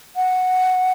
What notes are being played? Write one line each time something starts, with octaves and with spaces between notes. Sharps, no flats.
F#5